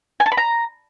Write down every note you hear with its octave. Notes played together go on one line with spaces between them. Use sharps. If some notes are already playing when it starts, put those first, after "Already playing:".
G#5
A5
B5
A#5